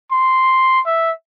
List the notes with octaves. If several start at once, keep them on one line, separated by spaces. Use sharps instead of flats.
C6
E5